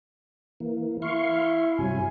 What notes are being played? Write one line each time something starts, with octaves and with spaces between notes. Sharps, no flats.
E3 A#3
E4 F5 C6 C#6
G2 C3 F#3 G#5